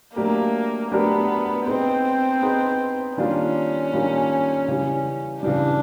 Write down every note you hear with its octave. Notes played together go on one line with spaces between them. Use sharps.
F#3 A3 A#3 D4 G4 A#4
F#3 A3 B3 D4 G4 A#4
B3 C4 D#4 G#4 B4
B3 D#4 G#4 B4
D#3 G3 A#3 C#4 D4 F4
D#3 G3 A#3 D4 F4
C#3 E3 G3
C#3 E3 G3 D4